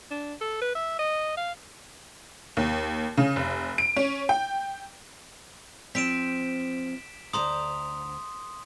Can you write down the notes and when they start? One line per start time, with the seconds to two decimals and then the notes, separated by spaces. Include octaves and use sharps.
0.11 D4
0.41 A4
0.62 B4
0.75 E5
0.99 D#5
1.37 F5
2.57 D#2
3.17 C#3
3.36 F1
3.78 D7
3.96 C#4
4.29 G5
5.95 F3 C4 B6 D7 E7
7.33 D2 C5 A#5 C6 D#6